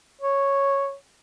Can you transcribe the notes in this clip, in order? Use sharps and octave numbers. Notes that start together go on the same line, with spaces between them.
C#5